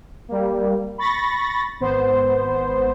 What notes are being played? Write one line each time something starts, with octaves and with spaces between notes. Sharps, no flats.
G3 A#3
B5 C#6 A6 A#6
G#1 B3 C5